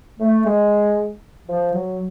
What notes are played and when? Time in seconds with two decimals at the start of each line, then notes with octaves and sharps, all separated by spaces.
0.19 A3
0.45 G#3
1.48 F3
1.73 F#3